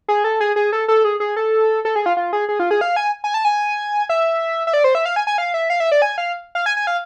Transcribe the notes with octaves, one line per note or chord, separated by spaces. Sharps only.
G#4
A4
G#4
G#4
A4
A4
G#4
G#4
A4
A4
G#4
F4
F4
G#4
G#4
F4
G#4
F5
G#5
G#5
A5
G#5
E5
E5
D5
C5
E5
F5
G#5
G#5
F5
E5
F5
E5
D5
G#5
F5
F5
G#5
G#5
F5